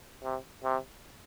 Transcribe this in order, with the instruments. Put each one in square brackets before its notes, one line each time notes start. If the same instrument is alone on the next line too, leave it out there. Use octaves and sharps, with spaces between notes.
[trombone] C3
C3